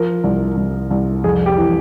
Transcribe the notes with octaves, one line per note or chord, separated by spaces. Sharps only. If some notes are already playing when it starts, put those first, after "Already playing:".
Already playing: F3 A#4
C2
C2
C2
F2 G#4
G4
E3